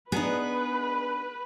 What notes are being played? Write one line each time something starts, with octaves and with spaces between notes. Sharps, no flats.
B3 D4 D#4 G#4 B4